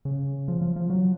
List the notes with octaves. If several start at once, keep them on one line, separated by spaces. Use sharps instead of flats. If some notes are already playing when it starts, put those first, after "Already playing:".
C#3
F3
F3
F3
F#3